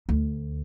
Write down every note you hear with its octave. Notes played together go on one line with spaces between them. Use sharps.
D2